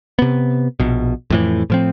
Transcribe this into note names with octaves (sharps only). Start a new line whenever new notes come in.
C3 B3
A#1 B2
F2 A2 E3
A2 F3 C4